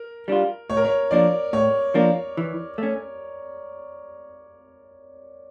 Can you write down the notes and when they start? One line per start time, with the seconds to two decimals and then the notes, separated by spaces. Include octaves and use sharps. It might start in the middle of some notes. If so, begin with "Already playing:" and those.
Already playing: A#4
0.28 G3 D4 F4
0.70 A2 C#5
0.77 A#4
0.85 C#5
1.11 F3 A#3 D4 D5
1.53 A2 C#5
1.94 F3 A#3 D4
2.37 E3
2.78 A3 C#4